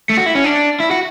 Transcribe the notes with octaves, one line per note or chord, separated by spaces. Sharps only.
A3
F#4
E4
C#4
D4
E4
F#4